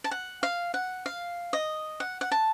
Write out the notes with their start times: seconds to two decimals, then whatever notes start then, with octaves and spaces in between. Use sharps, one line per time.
0.04 A5
0.11 F#5
0.43 F5
0.74 F#5
1.06 F5
1.53 D#5
2.00 F#5
2.21 F#5
2.32 A5